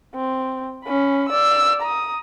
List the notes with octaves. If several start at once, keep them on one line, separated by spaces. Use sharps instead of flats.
C4
C#4 B5
D5 E6
A#5 D#6